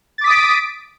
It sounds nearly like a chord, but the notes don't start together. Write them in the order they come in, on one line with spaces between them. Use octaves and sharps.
A6 D6 B6 D#6 D7